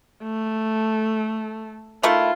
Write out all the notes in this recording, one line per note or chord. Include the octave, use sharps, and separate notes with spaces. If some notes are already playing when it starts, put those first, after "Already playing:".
A3
D#3 A3 E4 F4